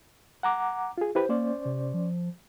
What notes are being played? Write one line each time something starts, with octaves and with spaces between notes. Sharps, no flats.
F#5 A#5 D6
F4 G#4
E4 G4 B4 C5
A#3 C#4 C5 D5
C3
F3